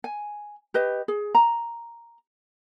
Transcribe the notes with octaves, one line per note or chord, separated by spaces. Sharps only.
G#5
G4 B4 D#5
G#4
A#5